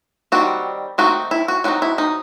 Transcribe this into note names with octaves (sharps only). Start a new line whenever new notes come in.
D#3 G3 C4 F#4
D#3 A3 C4 D#4 F#4
E4
F#4
F#3 C4 D#4 F#4
E4
D#4